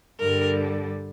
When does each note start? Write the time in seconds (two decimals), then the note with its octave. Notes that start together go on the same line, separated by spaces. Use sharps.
0.20 G2 D3 G3 A#4